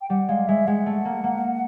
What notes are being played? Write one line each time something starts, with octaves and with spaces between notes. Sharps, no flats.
G5
G3 F#5
G#3 F5
G#3 E5
G#3 F#5
A3
A#3
A#3